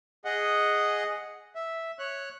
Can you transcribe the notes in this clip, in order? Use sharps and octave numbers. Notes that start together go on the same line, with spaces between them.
G#4 D#5 F#5
E5
C#5 F#6